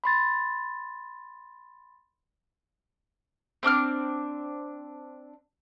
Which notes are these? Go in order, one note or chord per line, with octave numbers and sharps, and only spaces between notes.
B5 C6 A6
C4 D4 D6 F6